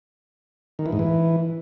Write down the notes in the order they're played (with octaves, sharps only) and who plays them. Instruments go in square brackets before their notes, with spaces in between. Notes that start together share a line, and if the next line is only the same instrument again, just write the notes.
[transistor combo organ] D#3
E3
G#2
E3